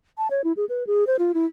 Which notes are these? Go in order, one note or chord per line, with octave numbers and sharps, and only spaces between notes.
A5
C#5
E4
G#4
B4
G#4
C5
F4
E4